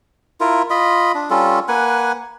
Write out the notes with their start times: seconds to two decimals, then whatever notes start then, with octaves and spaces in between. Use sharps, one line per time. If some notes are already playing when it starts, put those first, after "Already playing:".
0.40 E4 F4 A#4
0.70 F4 D#5 B5
1.15 D4
1.30 G3 C#4 F4 A4
1.68 A#3 B4 F#5 G#5